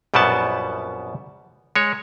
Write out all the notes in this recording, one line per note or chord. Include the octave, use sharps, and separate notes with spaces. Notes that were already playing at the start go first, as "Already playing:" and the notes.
A#1 F#2 B2 G3 B3 A5
G#3 C#5